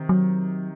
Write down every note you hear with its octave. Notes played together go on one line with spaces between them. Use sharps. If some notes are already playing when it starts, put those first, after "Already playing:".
Already playing: C3 D#3
F#3